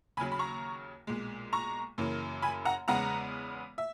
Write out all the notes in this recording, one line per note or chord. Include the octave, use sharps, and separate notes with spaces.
D#2 C#3 F#3 G#5 B5
B5
A#5 C#6
B1 A#2 G#3
A#5 C#6
F#2 C#3 E3 A#3
G#5 B5
F#5 A#5
E2 C#3 G#3 B3 F#5 A#5
E5